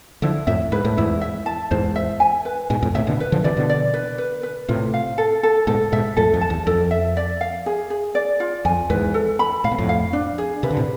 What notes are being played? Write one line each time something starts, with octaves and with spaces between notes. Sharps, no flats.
D3 F3 E4
F2 A2 E5
G#2 B4
A2
E2 G#2 E4
E5
A5
E2 G#2 C5
E5
G#5
B4
G#2 B2 G#5
F2 A2
A2 C3 E5
B2 D3
B4
D3 F3
C3 E3 D5
B2 D3
D5
B4
B4
B4
A2 C3 F4
F5
A4
A4
G#2 B2 A4
G#2 B2 E5
F2 A2 A4
F2
A5
E2
F2 A4
E5
D5
F5
G#4
G#4
D5
F4
F2 G#5
E2 G#2 B4
A4
B5
A2 F5
B2
F2 A2
F5
D4
G#4
C3 B4
D3
A2 C3